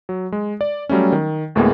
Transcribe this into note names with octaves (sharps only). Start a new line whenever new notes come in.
F#3
G#3
D5
F#3 G3 A3 C#4
D#3
D2 A2 G#3 A#3 B3 G#4